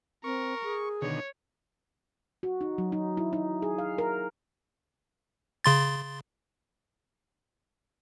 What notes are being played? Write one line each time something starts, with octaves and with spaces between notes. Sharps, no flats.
C4 A#4 C#6
G#4
B2 D3 D#3 C#5
F#4
D#4
F#3
D#4
E4
D#4
G#4
F5
A#4
C#3 C6 A6